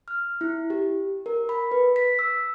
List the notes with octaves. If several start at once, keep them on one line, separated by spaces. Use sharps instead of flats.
F6
E4
G4
A#4
B5
B4
B6
E6